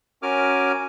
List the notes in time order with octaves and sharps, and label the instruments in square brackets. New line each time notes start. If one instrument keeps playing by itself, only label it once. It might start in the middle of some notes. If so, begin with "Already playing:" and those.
[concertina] C#4 F#4 A#4 G#5 D6 F6